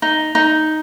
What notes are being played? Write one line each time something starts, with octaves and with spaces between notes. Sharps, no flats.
D#4
D#4